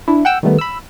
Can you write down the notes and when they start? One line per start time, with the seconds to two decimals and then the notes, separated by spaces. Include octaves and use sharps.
0.08 D4 E4
0.25 F#5 G5 E6
0.43 D#3 G3 A3 B3
0.59 B5 E6